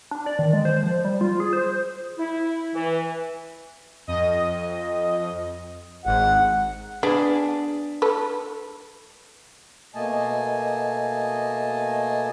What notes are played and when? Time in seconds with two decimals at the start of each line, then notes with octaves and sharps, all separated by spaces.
0.11 D4
0.26 D5
0.39 D#3
0.53 G#3
0.65 C5
0.83 F3
1.05 G3
1.21 F4
1.40 G#4
1.53 C5
2.19 E4
2.74 E3
4.07 F2 D#5
6.05 G#1 G#2 F#5
7.03 B3 D4 G#4
8.02 A4 B4
9.95 B2 A3 A#3 D#5 G#5 A5